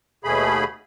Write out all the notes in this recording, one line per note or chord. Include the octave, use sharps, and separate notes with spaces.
D#2 B2 A3 G#4 B5